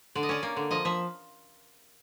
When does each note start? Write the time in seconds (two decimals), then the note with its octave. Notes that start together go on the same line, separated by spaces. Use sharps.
0.15 D3 D5
0.23 D#5
0.29 C#4 D5
0.43 A#3
0.57 D3
0.71 F3 D#5
0.85 F3 E5